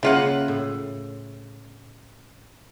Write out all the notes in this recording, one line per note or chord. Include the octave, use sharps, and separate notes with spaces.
C#3 A#3 E4 F4 D#5 F#5
A2